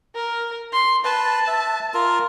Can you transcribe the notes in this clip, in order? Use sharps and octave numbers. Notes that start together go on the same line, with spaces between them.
A#4
C6
B4 A5
E5
F4 A#4